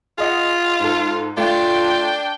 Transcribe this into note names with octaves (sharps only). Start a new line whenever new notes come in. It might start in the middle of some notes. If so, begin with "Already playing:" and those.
F4 G#4 D#5 F#5
G#2 A4
A3 D4 F4 G5